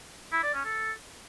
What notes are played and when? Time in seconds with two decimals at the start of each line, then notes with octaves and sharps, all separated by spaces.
0.32 E4
0.43 D5
0.54 C#4
0.65 A4